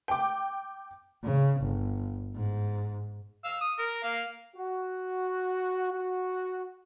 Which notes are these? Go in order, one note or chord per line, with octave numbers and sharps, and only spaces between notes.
G5 D6
C#3
G1
G#2
F5 E6
D#6
A#4
A#3 F5
F#4
F#4